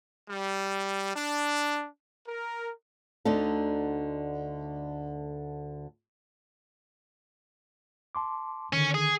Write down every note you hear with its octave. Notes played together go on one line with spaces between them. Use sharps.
G3
D4
A#4
D2 D3 D#4 A4
A5 C6 D6
D3 D#3 C#4
G#4